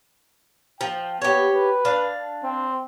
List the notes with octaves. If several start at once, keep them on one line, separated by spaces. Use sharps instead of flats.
F3 G5
B3 G4 C#5
B4
D4 F5
C4